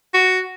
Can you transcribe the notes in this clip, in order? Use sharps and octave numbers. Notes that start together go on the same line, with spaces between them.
F#4